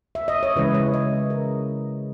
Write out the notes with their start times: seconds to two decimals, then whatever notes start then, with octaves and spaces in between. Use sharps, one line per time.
0.15 E5
0.28 D#5
0.43 C#5
0.56 C#3 E3 G#3 B4
0.74 C#5
0.94 D#5
1.30 A#4